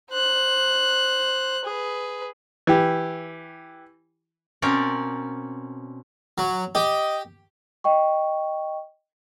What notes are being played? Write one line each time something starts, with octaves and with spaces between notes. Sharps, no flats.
C5 F#6
G#4 B4
E3 G4
B2 C4 C#4 A#4 D5
F#3
G4 D#5
D#5 G5 C#6